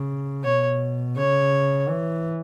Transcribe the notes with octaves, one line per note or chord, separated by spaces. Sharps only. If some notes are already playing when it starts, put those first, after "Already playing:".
Already playing: C#3
B2 C#5
C#3 C#5
E3